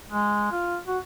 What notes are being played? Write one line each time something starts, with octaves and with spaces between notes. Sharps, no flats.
G#3
F4
F#4